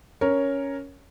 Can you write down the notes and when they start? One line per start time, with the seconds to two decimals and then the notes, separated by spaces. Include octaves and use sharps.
0.21 C#4 A#4 C#5